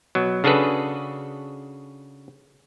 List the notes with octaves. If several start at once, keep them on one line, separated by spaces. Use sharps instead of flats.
B2 F#3
C#3 D4 F#4 G#4 A4 B4